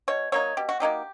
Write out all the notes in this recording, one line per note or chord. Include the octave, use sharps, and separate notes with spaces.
B2 C#5
F#3 A#3 D#4 C#5
B2 G4
F#4
F#3 A#3 D#4 G4